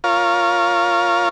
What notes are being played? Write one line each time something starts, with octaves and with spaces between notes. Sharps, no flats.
F4 A#4 C#5 F5